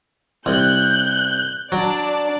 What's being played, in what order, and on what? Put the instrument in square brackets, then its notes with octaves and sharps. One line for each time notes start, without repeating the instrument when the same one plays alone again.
[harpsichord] C2 [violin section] F#6 G6
[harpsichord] F#3 [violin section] D4 D5